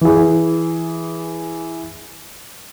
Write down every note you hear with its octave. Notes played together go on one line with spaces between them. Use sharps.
E3 G#4